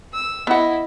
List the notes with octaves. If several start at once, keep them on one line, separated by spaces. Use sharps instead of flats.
E6
B3 E4 D#5 F#5